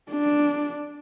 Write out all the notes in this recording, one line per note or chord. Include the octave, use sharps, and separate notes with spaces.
D4